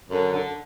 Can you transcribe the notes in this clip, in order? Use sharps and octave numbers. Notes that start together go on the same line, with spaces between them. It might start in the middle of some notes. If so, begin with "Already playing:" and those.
F#2 D3
D3